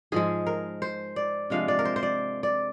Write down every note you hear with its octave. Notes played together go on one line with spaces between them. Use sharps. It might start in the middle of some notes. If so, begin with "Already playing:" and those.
G#2 F3 G#3 G#4
A#4
C5
D5
C3 F3 G#3 D4 F5
D5
A#4
C5
C5
D5
D5